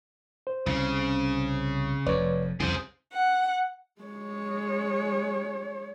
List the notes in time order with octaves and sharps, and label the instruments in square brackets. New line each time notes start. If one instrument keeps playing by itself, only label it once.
[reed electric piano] C5
[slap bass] C2 [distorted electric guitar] C#3
[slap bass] F1 F2 [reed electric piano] B4 C#5 D5
[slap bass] C2 C#3 [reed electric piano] F2 [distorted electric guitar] G#4 C5
[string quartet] F#5
[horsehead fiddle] G#3 C#5